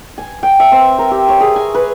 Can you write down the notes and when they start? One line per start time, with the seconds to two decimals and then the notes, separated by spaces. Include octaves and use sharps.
0.18 G#5
0.43 G5
0.60 E5
0.72 C4
0.99 A#4
1.11 G4
1.28 C#5
1.40 G#4
1.56 G#5
1.74 B4